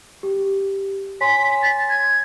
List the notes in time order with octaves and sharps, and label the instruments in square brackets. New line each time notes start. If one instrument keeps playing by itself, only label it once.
[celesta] G4
[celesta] C#5 G#5 C6 [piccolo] B6
[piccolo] A6
G#6